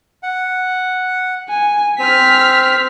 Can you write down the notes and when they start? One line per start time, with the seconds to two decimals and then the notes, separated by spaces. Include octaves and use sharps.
0.23 F#5
1.49 G#5
1.99 C4 F6 B6